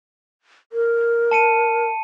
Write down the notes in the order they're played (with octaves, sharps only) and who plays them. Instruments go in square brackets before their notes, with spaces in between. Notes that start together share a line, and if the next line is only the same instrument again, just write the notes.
[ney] A#4
[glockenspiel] A5 C#7 D#7